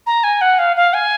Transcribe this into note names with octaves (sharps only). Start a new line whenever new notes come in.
A#5
G#5
F#5
F5
F5
G#5